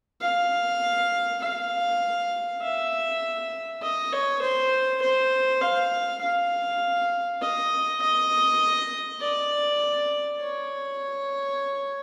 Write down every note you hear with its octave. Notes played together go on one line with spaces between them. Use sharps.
F5
F5
E5
D#5
C#5
C5
C5
F5
F5
D#5
D#5
D5
C#5